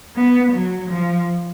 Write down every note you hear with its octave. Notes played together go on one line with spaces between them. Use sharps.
B3
F#3
F3